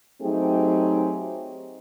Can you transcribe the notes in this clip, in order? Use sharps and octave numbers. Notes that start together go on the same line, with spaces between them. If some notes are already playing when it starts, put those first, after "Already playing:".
F#3 A3 C4 D#4 G4 G#4